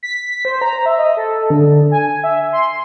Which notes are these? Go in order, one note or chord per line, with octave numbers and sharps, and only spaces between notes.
B6
C5
A#5
E5
D#5
A4
D3
G#5
E5
C6